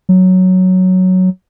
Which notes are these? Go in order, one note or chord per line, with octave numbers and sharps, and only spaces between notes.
F#3